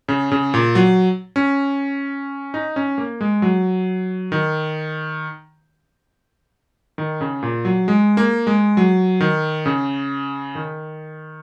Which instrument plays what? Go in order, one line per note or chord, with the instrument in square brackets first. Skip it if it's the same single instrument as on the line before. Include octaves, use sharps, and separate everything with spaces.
[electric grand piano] C#3
C#3
A#2
F#3
C#4
D#4
C#4
A#3
G#3
F#3
D#3
D#3
C#3
A#2
F#3
G#3
A#3
G#3
F#3
D#3
C#3
D#3